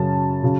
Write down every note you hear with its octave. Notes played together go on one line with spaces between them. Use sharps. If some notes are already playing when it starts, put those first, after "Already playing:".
Already playing: F#2 C#3 F#3 C#4 A5
C#3 F#3